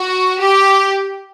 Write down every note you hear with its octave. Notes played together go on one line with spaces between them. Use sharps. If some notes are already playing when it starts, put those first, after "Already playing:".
Already playing: F#4
G4